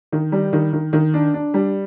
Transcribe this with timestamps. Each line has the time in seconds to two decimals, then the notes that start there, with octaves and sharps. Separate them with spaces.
0.12 D#3
0.32 G3
0.53 D#3
0.73 D#3
0.93 D#3
1.14 D4
1.34 D4
1.54 G3